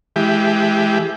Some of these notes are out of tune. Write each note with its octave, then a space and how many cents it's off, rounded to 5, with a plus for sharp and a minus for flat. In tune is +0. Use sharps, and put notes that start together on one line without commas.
E3 +5 G#3 +30 G4 +0